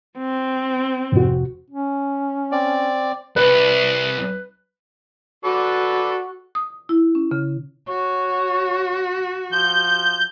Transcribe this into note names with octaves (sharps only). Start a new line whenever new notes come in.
C4
F1 F#4
C#4
C4 D5
C2 B4
F#4 A4 B4 D5
D#6
E4
C#4
C#3
F#4 C#5
F3 G6